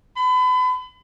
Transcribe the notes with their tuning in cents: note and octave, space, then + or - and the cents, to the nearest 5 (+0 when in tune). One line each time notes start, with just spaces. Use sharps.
B5 +35